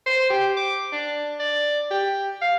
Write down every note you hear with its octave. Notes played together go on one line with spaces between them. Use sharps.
C5
G4
D6
D4
D5
G4
F5